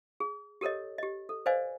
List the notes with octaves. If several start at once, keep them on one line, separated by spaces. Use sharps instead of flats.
G#4
G4 A4 A#4 C#5 D#5
G4 D#5
A4
B4 C5 D5 D#5 F5 G#5